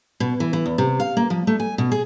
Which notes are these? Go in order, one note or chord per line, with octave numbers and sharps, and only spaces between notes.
B2
E3
E3
E2
C3
F5
A#3
F3
A3
G#5
B2
G#4